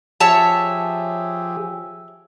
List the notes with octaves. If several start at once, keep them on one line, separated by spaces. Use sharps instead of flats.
F3 G4 G#4 C#5 E5 A5